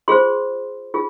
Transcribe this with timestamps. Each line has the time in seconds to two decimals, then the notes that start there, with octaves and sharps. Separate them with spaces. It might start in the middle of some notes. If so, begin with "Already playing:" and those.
0.08 F4 G#4 C5 C6
0.94 F4 G#4